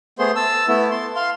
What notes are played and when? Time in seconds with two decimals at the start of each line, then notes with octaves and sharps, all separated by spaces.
0.19 A3 B3 G#4 C5 C6
0.36 A5 E6
0.68 A3 B3 E4
0.91 A5 C6
1.16 F5 C6